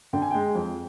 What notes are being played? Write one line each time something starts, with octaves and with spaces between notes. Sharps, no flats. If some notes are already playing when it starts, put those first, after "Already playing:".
D3 G5
G#5
G#3 G5
F2